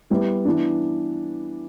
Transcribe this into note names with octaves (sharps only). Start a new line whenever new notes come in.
G3 B3 E4 B4
E3 B3 D4